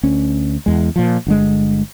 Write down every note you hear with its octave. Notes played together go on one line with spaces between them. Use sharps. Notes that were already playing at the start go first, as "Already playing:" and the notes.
D2 C#4
E2 G#3
A#2 F3
G1 D3 G#3